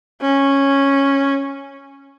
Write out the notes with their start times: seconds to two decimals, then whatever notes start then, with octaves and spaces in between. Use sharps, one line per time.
0.21 C#4